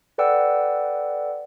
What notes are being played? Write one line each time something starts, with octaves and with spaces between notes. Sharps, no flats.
A4 B4 D5 F#5 G5 E6